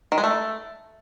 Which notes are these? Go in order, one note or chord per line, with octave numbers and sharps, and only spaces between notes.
D#3
G#3
A3